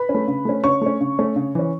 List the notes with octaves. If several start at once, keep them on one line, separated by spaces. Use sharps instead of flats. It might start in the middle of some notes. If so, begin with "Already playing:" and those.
Already playing: B4 B5
C#4
A3
C#3
A3 C#4
C#3 C#5 C#6
A3 C#4
C#3
A3 C#4
C#3
E3 C#4